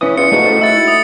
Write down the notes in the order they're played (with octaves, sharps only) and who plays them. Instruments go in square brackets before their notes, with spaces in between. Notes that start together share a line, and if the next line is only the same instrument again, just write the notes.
[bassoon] E3 [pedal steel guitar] C#4 D#6
[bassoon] E2 [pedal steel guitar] F4 [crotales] C#7
[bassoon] G#2 [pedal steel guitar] A3 D#4 F#4
[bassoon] A2
[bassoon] E4 [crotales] E6 A6 C#7
[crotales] D#6 C#7